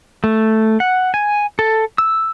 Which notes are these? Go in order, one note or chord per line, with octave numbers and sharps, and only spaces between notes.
A3
F#5
G#5
A4
E6